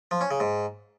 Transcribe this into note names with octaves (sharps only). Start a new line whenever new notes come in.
F3
C#4
C#3
G#2